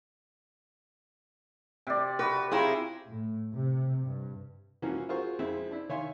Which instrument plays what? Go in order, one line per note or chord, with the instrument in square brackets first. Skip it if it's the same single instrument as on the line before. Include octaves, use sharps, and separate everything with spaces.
[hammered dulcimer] C3 D5
[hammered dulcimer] F#4 [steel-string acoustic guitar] B4
[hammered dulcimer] C4 G5 A#5 [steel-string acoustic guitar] E4 F4 G#4
[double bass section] A2
C3
G2
[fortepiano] E3 F3 A#3 C#4 F#4
F4 F#4 G#4 A#4 C5 C#6
F2 G#3 C4 E4 E5
D4 E4
D#3 C#5 E5 F5 G#5 C6